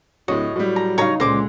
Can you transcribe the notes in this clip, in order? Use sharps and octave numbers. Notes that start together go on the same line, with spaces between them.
D1 A2 F#4 C#5 D#5
A2 F#3 G3
A#5
C#3 D#4 C#5 F5 A#5
C#2 A#2 D3 G#3 C5 D6 A#6